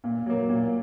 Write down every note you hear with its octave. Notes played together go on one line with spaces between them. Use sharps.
A#2
F#3 A#3
A#2